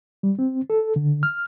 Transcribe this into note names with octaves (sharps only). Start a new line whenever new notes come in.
G3
C4
A4
D3
F6